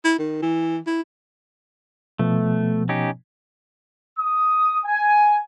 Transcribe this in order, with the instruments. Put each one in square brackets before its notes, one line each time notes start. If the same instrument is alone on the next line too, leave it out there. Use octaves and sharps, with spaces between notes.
[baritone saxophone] E4
D#3
E3
E4
[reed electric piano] B2 F3 B3 [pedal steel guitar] A3
[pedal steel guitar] C#4 D#4 G4
[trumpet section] D#6
G#5